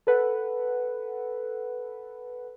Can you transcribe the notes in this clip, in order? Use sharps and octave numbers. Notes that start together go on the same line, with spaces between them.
A4 B4 F#5